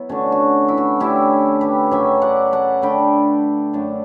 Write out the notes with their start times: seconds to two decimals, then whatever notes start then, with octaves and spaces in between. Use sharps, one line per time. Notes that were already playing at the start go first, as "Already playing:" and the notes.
Already playing: F#3 B3 E4
0.09 D3 A3 C#4 F#4
0.32 F#4
0.68 E4
0.78 F#4
1.00 D3 A3 C#4 E4 G4
1.61 G4 B4
1.91 F#2 C#3 F#3 C#4 E5 G5
2.22 D5 F#5
2.52 F#5 A5
2.82 D3 A3 D4 G5 B5
3.73 F#2 D3 A3